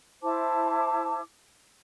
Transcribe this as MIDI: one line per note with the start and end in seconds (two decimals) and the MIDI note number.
0.22 1.20 64
0.22 1.20 72
0.22 1.20 81
0.22 1.20 86